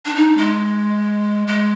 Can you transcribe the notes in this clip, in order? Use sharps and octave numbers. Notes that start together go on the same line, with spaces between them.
D4
D#4
G#3
G#3